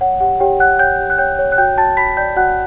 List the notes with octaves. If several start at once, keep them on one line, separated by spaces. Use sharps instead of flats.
C#5 F#5
G4 F#5
G4 C#5 G5
C#5 F#5 F#6
C#5 G5 G6
G4
F#6
C#5 G5 G6
C#5
F#6
F#4 G5 G6
F#4 A5 A6
F#4 B5 B6
D5 G5 G6
F#4 F#5 F#6